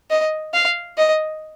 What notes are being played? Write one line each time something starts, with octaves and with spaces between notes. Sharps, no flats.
D#5
F5
D#5